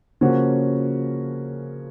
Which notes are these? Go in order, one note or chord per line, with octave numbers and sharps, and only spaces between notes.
C#3 F3 A#3 C#4 F#4